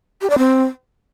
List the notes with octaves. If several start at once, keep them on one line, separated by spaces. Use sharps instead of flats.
G4
D5
C4